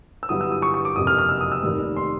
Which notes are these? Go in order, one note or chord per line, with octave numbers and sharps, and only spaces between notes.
E6
G2 D3 F#3 B3 E4 D#6
E6
D#6
C#6
C#6
D6
F#1 F2 C3 D#6
F6
F6
E6
D#6
E6
F1 D#2 D#3 G3
C6